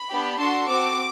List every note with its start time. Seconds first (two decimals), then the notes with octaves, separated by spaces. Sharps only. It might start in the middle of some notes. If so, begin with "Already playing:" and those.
Already playing: B5
0.10 B3 D4 G4
0.38 D4 F#4 A4 C6
0.67 C4 F#4 A4 D6